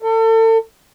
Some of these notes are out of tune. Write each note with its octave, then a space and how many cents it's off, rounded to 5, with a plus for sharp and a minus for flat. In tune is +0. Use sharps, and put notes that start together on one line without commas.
A4 +35